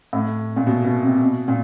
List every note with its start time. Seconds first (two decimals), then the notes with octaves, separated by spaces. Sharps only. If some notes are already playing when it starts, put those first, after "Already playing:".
0.13 A2
0.56 A#2
0.67 B2
0.85 B2
1.03 C3
1.21 B2
1.48 A#2